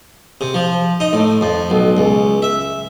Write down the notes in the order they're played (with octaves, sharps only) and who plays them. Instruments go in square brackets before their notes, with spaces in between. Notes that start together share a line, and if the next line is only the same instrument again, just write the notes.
[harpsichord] C3
F3
D#4
A2
F2
B1
C#2
E5